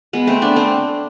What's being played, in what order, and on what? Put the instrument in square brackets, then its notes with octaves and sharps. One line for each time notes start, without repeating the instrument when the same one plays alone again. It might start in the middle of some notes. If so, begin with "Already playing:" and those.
[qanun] G#3 B3
A3 C4
B3 D4
A3 C4